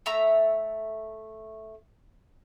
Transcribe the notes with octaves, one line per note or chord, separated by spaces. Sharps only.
A3 E5 A#5 E6